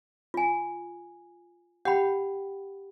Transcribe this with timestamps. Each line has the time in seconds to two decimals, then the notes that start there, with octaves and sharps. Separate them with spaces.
0.34 F4 G#5
1.85 G4 F#5 G5 B5